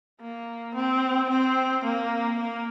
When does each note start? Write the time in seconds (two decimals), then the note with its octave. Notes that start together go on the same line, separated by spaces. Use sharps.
0.21 A#3
0.75 C4
1.29 C4
1.84 A#3
2.39 A#3